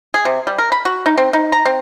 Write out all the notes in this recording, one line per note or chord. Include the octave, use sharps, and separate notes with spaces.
G#4
C3
G3
A#4
B5
F#4
D#4
C4
D#4
A#5
C4